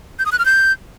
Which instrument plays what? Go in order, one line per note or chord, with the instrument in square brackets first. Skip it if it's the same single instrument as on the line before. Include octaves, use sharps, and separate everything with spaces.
[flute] G6
D#6
F#6
F6
G6